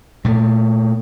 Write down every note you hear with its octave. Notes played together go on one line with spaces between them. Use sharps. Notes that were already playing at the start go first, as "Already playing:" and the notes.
A#2 A3